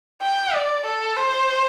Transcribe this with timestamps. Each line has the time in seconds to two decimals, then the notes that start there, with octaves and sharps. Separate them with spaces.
0.22 G5
0.54 D5
0.85 A4
1.17 C5